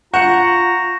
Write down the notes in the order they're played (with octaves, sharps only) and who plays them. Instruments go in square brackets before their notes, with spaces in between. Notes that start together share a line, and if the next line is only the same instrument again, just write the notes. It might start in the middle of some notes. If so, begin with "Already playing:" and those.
[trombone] F4 [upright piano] F#5 C#7 [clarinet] A#5 [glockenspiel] C#6 G6 E7